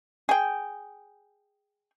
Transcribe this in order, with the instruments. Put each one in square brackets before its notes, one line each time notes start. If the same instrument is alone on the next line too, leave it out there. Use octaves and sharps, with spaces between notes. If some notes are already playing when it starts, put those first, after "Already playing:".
[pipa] G#4 G5